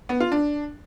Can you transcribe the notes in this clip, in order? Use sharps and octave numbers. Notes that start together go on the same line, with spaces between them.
B3
F4
D4